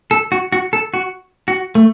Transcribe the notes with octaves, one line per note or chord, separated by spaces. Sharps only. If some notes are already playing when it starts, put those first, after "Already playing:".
A4
F#4
F#4
A4
F#4
F#4
A3